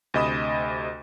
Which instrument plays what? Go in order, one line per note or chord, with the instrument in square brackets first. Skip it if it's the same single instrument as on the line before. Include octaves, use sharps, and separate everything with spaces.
[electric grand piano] D2 C3 D#5 B5 D#6 E7